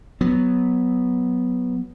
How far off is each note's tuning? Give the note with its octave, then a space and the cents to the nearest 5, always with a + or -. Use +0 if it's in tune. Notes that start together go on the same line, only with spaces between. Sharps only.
F#3 +0 B3 +0